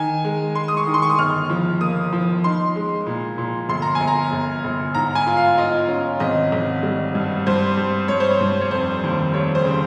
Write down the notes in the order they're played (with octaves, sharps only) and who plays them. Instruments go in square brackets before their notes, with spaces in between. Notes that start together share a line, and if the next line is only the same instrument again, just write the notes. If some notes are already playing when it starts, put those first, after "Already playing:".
Already playing: [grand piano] D#3 G#5
G#3
G#3 C6
D#6
C#6
D#3
C6
C#6
D#6
G1 F6
F3
A#3 D#6
F3
D#4 C6
G#3
A#2
A#2
G1 C6
A#5
G#5
G1
A#5
G1
G1
G#2 A#5
G#5
F4
F5
F4 D#5
C#4
G#1 D#5
G#1
G3
G2
G2 C5
G2
G2 C#5
C5
C#5
G2
C#5
F1 C5
D#2
F1 C#5
C5
C#3